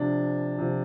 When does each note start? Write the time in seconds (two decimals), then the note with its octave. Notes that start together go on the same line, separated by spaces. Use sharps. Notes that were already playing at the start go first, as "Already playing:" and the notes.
Already playing: C3 F3 D4
0.59 C3 F3